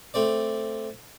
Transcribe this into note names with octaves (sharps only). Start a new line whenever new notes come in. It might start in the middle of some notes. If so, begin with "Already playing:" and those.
A3 C4 D5